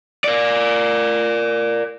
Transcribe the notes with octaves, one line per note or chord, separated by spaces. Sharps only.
A#4 D5